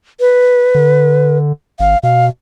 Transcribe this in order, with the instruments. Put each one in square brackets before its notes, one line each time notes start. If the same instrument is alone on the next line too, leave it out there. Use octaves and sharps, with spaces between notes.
[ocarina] B4
[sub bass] D3
[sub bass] G#1 [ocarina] F5
[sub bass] B2 [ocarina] F5